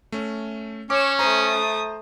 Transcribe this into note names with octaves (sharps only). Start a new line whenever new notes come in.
A3 C#4
C#4 C#5 D6 E7
A3 C5 A#5 D#6